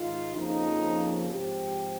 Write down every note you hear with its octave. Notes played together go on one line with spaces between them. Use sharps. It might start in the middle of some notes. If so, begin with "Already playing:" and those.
Already playing: G#2 D#3 G#3 D#4 F4
F2 C#3 F3 A#3 D#4
G#2 F3 C4 G4